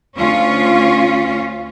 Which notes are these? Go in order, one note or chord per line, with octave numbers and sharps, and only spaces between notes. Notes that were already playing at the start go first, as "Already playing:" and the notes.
D2 C#4 F4